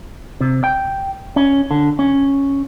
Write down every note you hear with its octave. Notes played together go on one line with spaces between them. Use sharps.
C3
G5
C#4
D3
C#4